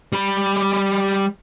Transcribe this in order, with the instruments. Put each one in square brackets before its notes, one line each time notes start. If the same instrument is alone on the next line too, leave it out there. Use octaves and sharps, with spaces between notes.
[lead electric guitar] G3 B5